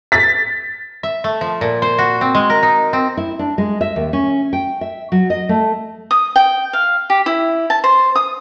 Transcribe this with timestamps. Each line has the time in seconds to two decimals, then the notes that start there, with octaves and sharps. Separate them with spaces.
0.12 A6 B6
1.03 E5
1.24 A3
1.41 F3
1.61 A#2
1.82 C5
1.99 F#4
2.21 C4
2.35 G#3
2.50 A#4
2.63 D#4
2.93 C4
3.17 E4
3.39 D4
3.58 G#3
3.81 E5
3.96 D#2
4.13 C#4
4.53 G5
4.81 E5
5.12 F#3
5.30 D#5
5.49 A3
6.11 D#6
6.36 G5
6.73 F5
7.10 G4
7.26 E4
7.70 A5
7.84 C5
8.16 D#6